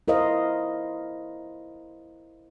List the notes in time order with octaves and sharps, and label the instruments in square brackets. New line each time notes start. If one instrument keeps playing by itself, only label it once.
[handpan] E4 A#4 C5 D#5 F5